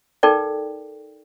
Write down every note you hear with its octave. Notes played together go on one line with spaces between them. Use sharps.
D#4 A4 A#4 D5 G5